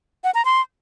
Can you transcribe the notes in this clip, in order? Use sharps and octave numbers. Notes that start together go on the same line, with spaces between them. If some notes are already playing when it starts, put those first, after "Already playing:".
F#5
A#5
C6